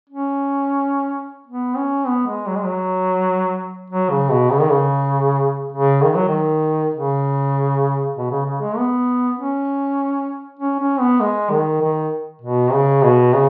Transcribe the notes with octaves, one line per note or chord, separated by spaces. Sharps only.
C#4
B3
C#4
B3
G#3
F#3
G#3
F#3
F#3
C#3
B2
C#3
D#3
C#3
C#3
D#3
F#3
D#3
C#3
B2
C#3
C#3
G#3
B3
C#4
C#4
C#4
B3
G#3
D#3
D#3
B2
C#3
B2
C#3